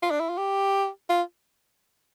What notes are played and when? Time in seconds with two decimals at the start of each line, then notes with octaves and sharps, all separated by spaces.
0.03 F4
0.11 D4
0.20 E4
0.29 F4
0.38 G4
1.09 F4